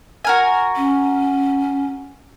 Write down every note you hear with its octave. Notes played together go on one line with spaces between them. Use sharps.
F#4 A#4 G#5
C#4